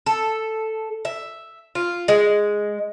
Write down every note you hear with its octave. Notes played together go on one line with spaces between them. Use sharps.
A4
E5
F4
G#3